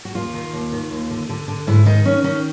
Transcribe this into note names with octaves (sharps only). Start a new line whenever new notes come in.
F#4
D#2 F4
D#3
D#2
D#3
D#2
D3
D3
D3
G#2 E4
D#3 D#4
D#3 C#4
D#3 C#4